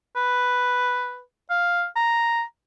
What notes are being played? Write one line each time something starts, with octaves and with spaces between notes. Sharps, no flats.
B4
F5
A#5